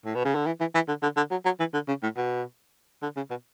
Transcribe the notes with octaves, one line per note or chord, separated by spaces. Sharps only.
A2
B2
C#3
D3
E3
E3
E3
D3
D3
D3
F#3
F#3
E3
D3
C#3
A2
B2
D3
C#3
B2